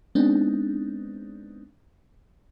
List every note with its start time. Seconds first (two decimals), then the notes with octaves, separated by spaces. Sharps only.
0.15 G#3 B3 C4 D4 D#4